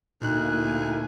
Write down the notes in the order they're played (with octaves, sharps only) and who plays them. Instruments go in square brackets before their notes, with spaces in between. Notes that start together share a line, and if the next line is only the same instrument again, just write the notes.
[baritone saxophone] D2 [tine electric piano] A#2 D#4 F#6 [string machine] A#3 E4 G#5